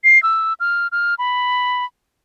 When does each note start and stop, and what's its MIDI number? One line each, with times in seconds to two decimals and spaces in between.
0.04 0.21 96
0.23 0.53 88
0.60 0.87 89
0.92 1.15 89
1.19 1.85 83